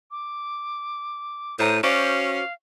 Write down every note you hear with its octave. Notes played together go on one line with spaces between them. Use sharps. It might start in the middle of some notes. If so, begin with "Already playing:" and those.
D6
A2 C5 A5 A#5 D#7
C#4 F#4 C5 D5 F5